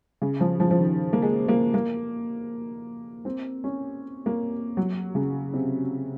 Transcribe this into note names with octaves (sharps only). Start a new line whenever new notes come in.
C#3
F3
F3
F3
D#3
A#3
G#3
A#3
A#3
C4
C#4
A#3
F#3
C#3
C3